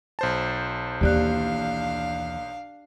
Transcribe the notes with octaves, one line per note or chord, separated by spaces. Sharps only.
B1 C5 A5
D#2 E3 D4 G4 D5 F5 F#6